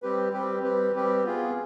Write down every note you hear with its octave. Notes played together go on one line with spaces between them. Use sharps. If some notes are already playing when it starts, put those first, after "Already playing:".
G3 C4 G4 B4
G3 C4 G4 B4
G3 C4 G4 B4
G3 C4 G4 B4
B3 F4 G#4